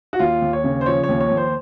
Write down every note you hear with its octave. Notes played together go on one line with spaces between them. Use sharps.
F#4
D#2 F4
D#2
C#5
C#3
C5
F3 C#5
C#5
D#2
C#5
D#2
C5